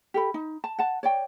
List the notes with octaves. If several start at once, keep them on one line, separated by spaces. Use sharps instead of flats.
G4 A4 B5
D#4
A5
F#5 A5
C#5 D5 G5